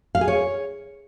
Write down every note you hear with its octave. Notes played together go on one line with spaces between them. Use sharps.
F5
G#4
C#5